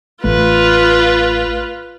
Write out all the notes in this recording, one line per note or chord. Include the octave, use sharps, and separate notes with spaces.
A1 A3 F4 B4